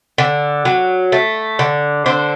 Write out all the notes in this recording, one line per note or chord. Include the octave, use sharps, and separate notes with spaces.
D3
F#3
A3
D3
D3 C5